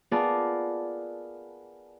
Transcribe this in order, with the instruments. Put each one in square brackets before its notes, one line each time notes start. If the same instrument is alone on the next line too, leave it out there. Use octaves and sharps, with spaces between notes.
[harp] B3 F4 G#4 A#4 D5 A5